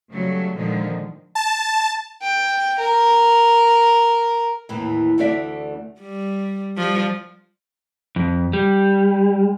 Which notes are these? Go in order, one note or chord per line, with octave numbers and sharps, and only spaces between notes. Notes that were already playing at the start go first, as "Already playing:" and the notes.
C#3 F#3 G3 A3
A#2 D3 D#3 F3 G#3
A5
G5
A#4
D#2 A2 E3
D2 E3 A3 D4 D5 E5
G3
F3 G3
F2
G3